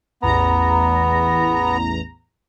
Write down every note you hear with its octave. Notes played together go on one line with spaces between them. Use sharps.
A1 E2 B3 A#5